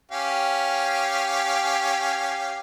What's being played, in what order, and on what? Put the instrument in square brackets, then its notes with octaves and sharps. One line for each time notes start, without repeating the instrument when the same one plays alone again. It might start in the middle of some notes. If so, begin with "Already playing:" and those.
[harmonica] C#4 G4 F5